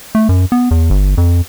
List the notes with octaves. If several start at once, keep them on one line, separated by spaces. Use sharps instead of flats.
A3
F#2
B3
E2
G1
F2